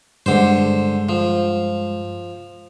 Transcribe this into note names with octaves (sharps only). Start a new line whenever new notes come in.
G2 D3 G#3 C5
F3